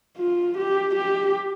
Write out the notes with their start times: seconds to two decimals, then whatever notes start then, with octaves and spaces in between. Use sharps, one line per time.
0.18 F4
0.57 G4
0.95 G4